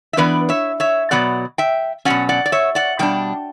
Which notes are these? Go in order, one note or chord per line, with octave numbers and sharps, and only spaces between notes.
E5
E3 B3 D4 B4 D5
C#5 E5
C#5 E5
B2 F#3 B3 D5 F#5
E5 G5
B2 F#3 C#4 D5 F#5
D5 F#5
D5
C#5 E5
D5 F#5
B2 G3 D4 G5